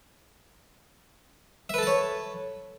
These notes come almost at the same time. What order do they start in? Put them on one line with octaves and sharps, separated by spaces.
E5 B4 A4 A5 C#5